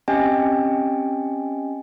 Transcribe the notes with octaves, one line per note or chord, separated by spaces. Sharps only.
C4 C#4 G4 D#5 G5 G#5